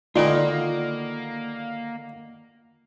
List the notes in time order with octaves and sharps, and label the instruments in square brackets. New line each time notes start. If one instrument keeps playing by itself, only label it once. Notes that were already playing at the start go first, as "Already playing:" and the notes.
[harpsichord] D3 D#3 B3 [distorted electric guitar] A#3 [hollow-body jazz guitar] F4 D5